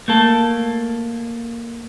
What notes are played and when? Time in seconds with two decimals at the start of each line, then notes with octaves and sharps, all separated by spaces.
0.08 A3 A#3 A4